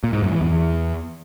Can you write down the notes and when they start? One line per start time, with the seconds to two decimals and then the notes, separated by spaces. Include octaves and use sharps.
0.04 A#2
0.13 G#2
0.22 F#2
0.32 E3
0.41 E2